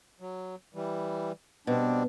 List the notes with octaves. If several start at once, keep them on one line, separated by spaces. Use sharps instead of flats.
F#3
E3 G3
B2 G3 C4 D4